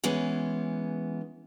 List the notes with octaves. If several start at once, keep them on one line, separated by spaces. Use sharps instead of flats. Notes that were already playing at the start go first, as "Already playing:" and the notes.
E3 G#3 B3 C#4